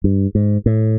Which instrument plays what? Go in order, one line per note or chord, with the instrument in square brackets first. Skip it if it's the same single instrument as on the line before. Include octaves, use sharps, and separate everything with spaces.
[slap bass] G2
G#2
A2